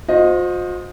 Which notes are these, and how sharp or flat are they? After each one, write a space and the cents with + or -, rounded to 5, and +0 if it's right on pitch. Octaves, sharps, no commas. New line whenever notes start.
F4 +45 C5 +0 D#5 -5